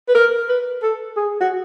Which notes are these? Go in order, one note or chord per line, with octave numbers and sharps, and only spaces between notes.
B4
A#4
B4
A4
G#4
F#4